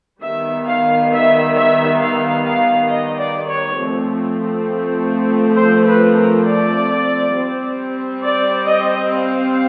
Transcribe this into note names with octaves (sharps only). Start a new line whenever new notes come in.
D#3 G3 B3 E5
F5
E5
E5
F5
F5
D#5
D5
C#5
F3 A3 C4
C5
B4
A#4
D5
G3 C4
D5
D#5
F5